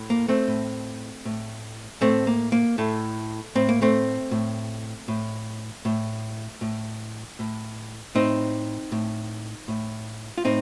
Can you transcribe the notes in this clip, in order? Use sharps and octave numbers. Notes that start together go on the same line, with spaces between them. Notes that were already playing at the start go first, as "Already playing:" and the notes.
Already playing: A2
A#3
A3 C4
A2
A2
A2 A3 C4
A#3
A#3
A2 A3
A2 C4
A#3
A3 C4
A2
A2
A2
A2
A2
A2 C4 D#4
A2
A2
F4
A2 C4 D#4